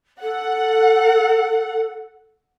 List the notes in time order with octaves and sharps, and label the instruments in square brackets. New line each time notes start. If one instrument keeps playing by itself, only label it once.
[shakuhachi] A4 [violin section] F#5